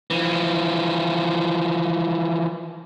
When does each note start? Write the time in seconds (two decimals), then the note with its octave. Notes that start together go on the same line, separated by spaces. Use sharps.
0.10 E3 F3